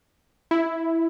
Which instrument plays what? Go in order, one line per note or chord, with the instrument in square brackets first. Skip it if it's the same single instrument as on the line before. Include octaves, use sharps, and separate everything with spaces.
[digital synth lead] E4